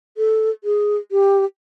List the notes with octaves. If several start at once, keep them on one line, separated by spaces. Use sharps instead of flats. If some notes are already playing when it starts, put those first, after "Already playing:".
A4
G#4
G4